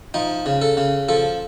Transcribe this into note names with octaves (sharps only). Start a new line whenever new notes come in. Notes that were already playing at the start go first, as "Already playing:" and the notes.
F3 D#4
C#3
A4
C#3
F3 A4